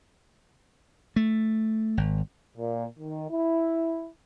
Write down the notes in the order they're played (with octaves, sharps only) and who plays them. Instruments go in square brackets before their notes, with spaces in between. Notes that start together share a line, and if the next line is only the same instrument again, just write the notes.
[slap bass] A3
G#1
[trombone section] A#2
D#3
E4